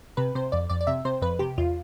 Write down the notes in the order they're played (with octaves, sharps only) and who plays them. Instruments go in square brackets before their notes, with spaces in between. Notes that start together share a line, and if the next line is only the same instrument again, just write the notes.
[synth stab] C3 B4
C3 C5
F2 D5
F2 D5
D5
C3 E5
C3 C5
F2 B4
C3 G4
E2 F4